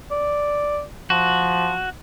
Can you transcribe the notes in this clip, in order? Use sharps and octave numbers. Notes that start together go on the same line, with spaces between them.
D5
F3 F#4